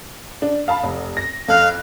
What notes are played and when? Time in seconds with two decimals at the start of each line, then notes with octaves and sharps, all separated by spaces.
0.42 D4
0.68 F5 A5 B5
0.83 F1
1.17 A#6
1.48 F2 A4 F5 F#6